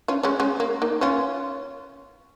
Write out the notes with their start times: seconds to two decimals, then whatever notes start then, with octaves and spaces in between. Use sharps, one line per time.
0.08 C#4 F4
0.23 G#3 C#4
0.40 G#3 C#4
0.60 A#3
0.82 A#3 D#4
1.01 C#4 F4